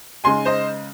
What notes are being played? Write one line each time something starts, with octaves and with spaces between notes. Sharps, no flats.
C#3 G#3 D#4 G#5 C6
C5 D#5